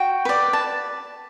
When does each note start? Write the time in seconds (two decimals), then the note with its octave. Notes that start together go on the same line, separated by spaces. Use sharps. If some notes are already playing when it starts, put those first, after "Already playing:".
Already playing: F#4 G5
0.25 B4 D5
0.53 A5